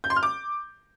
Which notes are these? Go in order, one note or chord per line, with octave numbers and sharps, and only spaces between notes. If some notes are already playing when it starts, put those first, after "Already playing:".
G6
C6
F6
D6